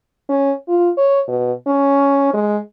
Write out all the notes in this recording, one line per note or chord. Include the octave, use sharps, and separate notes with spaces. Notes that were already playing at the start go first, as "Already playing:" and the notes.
C#4
F4
C#5
B2
C#4
G#3